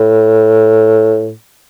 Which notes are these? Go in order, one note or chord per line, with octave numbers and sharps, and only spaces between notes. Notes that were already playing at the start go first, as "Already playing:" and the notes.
Already playing: A2